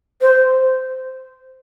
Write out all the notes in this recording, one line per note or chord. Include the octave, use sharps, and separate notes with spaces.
C5